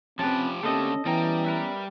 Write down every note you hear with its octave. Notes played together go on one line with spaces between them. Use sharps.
F3 C4 C#4 G4 B4 A5
D3 A3 A#3 C4 C#4 G4 A4 D#5
E3 G3 B3 C#4 G5 A#5
A#4 B4 E5